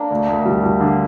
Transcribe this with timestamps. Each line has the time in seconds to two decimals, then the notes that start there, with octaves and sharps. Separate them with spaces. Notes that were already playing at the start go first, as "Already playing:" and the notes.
Already playing: A#3 D4
0.10 D2
0.29 D2
0.46 G3
0.63 G3
0.81 D3